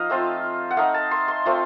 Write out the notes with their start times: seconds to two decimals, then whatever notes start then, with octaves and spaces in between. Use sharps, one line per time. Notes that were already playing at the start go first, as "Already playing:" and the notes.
Already playing: F3 D#4 D#5 F5
0.10 A3 C4 F4
0.70 F#5
0.77 A3 D#4 F5
0.94 A5
1.11 C6
1.28 C6
1.46 A3 C4 F4